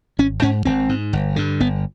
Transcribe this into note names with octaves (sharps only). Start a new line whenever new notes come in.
G#1 C#4
G#2 C#4
G#1 C4
G#2
G1
G2 D3
G1 B3